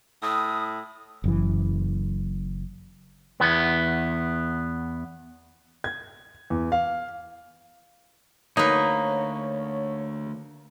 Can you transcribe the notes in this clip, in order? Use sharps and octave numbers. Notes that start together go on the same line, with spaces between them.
A2 D#6
F#1 F#2 E3
E2 B3
G#6
E2
F5
D2 A#3 D#4 B4 C#5 D#5